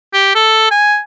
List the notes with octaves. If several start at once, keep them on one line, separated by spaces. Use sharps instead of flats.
G4
A4
G#5